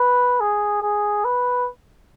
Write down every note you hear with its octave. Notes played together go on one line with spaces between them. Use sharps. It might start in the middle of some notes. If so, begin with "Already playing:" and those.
Already playing: B4
G#4
G#4
B4